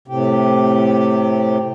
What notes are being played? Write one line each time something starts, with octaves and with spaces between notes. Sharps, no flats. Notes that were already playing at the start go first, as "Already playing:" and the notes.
A2 C3 G4